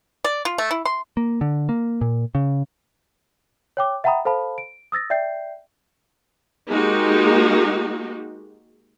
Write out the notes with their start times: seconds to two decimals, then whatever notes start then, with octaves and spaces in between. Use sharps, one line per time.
0.24 D5
0.45 F4
0.58 A3
0.71 E4
0.85 C6
1.17 A#3
1.41 D3
1.69 A#3
2.01 A#2
2.35 C#3
3.77 C#5 G5 D6
4.04 E5 F#5 G5 A#5 B5 D#6
4.25 A4 C5 F5 A5 B5
4.58 D7
4.92 D#6 E6 A6 A#6
5.10 D5 E5 G5 G6 C7
6.69 G#3 A#3 D#4 F#4 G4